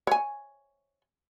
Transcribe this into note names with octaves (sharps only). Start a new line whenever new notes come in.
C#5 G#5